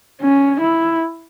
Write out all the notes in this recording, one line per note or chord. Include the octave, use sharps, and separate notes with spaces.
C#4
E4